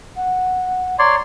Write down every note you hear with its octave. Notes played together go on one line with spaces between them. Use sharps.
F#5
C#5 D5 A#5 C6